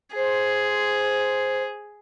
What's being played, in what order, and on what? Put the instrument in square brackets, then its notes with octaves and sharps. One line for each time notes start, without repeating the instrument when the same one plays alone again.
[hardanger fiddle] G#4 [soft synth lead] C5